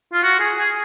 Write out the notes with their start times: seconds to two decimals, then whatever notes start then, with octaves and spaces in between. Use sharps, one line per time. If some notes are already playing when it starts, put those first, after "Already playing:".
0.13 F4
0.23 F#4
0.40 G#4
0.58 G#4